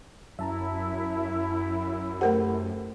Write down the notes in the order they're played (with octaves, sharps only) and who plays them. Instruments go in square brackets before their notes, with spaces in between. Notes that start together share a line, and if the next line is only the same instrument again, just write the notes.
[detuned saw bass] F#2 [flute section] E4 [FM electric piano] E5 A5 A#5
[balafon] A3 A#4 F#5 [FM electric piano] G4 A4 C5